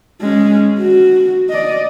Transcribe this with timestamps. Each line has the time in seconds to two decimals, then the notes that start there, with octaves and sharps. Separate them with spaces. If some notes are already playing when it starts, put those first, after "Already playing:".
0.22 G#3 C#4
0.78 F#4
1.50 D5 D#5